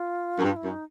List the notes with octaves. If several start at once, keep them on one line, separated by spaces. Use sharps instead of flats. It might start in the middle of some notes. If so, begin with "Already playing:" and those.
Already playing: F4
F#2
G2 F4
E4
F#2
D#4